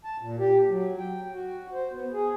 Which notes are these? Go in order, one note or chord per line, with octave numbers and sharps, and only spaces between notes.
A5
A#2
G4
F#3
G5
F#4
C5
B3
G#4